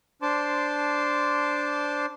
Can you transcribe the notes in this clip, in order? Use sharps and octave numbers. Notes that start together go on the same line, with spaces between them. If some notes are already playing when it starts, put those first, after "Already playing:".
D4 C5 A5 C6 D6